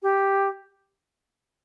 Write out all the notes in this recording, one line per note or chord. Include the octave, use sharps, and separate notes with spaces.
G4